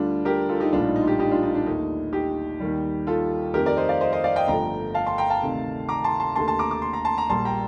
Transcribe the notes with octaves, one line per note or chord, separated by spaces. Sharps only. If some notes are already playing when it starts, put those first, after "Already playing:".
Already playing: D2 D3 G3 D4 F4
G4 A#4
F4 A4
D#4 G4
A#1 A2 G3 D4 F4
D#4
D#4
F4
D#4 G4
D#4 G4
D4 F4
D#4
D4
D#2 D3 A3 D#4
D#4 G4
D#2 D#3 G3
F4 A4
F2 D#3 A3 G4 A#4
A#4 D5
C5 D#5
D5 F5
C5 D#5
C5 D#5
D5 F5
D#5 G5
G1 G2 F3 A3 G5 A#5
F5 A5
A5 C6
G5 A#5
F5 A5
D2 C3 D#3
A#5 D6
A5 C6
A5 C6
D#2 D3 A3 A5 C6
A5 C6
A#5 D6
D6
C6
A#5
A5 C6
A#5
A#1 A#2 G3 A5 C6
G5 A#5